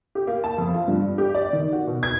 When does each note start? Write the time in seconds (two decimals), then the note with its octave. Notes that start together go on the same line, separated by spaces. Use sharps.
0.15 G4
0.27 A#3
0.44 A5
0.58 F2
0.74 F4
0.88 G2
1.18 G4
1.35 D5
1.53 D#3
1.73 F#4
1.87 B2
2.03 G#6